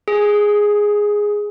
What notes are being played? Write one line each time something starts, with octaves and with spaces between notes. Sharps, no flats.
G#4